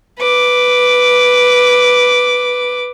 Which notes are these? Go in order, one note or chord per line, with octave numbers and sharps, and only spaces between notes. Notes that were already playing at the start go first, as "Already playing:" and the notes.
B4 D6